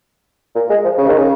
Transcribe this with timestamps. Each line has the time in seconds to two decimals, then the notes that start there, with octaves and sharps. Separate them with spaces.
0.55 A#2
0.70 G#3
0.84 F3
0.98 C#3
1.08 D#3
1.18 C#3